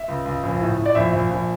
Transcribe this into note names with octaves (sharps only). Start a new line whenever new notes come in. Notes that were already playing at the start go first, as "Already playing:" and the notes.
Already playing: E5
C#2
C#2
A#1
A2
A2
D5
A#1 E5
A#1
A#1